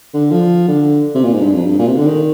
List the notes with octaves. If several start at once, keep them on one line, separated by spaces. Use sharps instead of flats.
D3
F3
D3
C3
A#2
G#2
G2
F2
G2
A#2
C3
D3
D#3